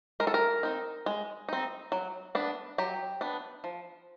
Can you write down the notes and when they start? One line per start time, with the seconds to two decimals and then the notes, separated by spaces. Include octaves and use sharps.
0.20 G#3 A#4
0.27 A4
0.34 A#4
0.63 C4 D#4
1.06 G#3
1.49 C4 D#4
1.92 F#3
2.35 B3 D4
2.78 F#3 G4
3.21 B3 D4
3.64 F3